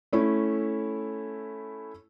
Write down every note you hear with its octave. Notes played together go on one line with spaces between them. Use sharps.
A3 C#4 E4